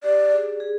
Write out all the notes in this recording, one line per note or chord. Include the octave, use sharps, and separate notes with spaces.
G4 D5
G#4
G#4